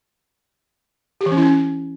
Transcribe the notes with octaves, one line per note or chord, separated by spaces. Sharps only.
G4
E3
C#4
E4
C#4